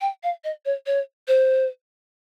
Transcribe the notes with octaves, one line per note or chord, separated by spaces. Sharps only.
G5
F5
D#5
C#5
C#5
C5